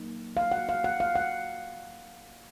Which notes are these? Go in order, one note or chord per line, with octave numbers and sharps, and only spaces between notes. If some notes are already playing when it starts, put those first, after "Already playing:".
Already playing: F#3 A#3 D#4
F5
F#5
F5
F#5
F5
F#5